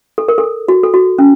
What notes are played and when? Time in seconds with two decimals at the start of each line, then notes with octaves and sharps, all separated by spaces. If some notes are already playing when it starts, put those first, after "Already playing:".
0.18 A4
0.28 A#4
0.38 A4
0.68 F#4
0.83 A4
0.94 F#4
1.19 C#4